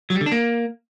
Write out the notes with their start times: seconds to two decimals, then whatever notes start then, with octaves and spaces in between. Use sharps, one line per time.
0.10 F#3
0.16 G3
0.21 D3
0.26 D4
0.32 A#3